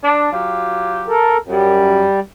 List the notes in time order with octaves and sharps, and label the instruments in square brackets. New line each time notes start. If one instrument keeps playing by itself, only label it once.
[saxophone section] D4
F#3 F4 G4
[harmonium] A4 A#4
[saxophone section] F#2 [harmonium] G3